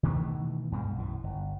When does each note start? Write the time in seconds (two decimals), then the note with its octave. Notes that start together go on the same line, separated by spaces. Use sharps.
0.03 B2 D#3 E3 A3
0.72 G2 B2 G3 G#3
0.95 B1 F#2 E3
1.24 G1